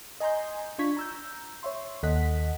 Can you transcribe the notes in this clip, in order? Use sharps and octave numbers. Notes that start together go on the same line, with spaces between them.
D#5 G#5 A#5 C6 G6
D4 F4 C#6 G#6 B6
A#5 E6 G6
C#5 E5 C6
D#2 A4 D#5 F#5 F#6 B6